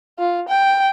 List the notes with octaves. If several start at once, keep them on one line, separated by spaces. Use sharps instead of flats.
F4
G5